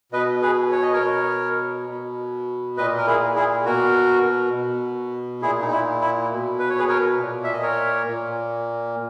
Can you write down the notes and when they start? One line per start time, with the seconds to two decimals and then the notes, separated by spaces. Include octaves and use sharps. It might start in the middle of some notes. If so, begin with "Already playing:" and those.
0.12 B2 B4 D#5
0.42 G#4 B4
0.72 C#5
0.82 D#5
0.93 A#4 C#5
1.01 B2
1.89 B2
2.77 A#2 B4 D#5
2.97 A#4
3.07 E4 G#4
3.36 E4 G#4
3.65 B2 F#4 A#4
4.53 B2
5.41 A#2 E4 G#4
5.62 D#4
5.71 E4
6.01 E4
6.30 B2
6.59 B4
6.70 C#5
6.79 G#4 B4
6.88 A#4 C#5
7.18 A#2
7.44 E5
7.53 D#5
7.62 A#4 C#5
8.07 A#2